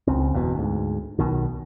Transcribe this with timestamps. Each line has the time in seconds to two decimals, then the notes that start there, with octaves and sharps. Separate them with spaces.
0.07 C#2 C#3 C4
0.33 F#1 E2 G2 B2
0.55 D2 G#2
1.19 B1 B2 D#3